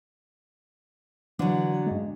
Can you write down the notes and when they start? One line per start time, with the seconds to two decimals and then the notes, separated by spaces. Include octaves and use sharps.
1.39 D3 E3 F#3
1.86 G2 G#3